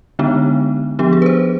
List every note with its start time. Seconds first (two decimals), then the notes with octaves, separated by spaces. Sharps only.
0.19 D3 G#3 B3 D4 D#4
0.99 F3 B3 D4 G4
1.13 G#4
1.22 B4
1.26 C5